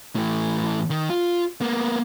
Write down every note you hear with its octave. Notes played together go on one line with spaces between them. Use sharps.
A2 E3
D#3
F4
A#3 B3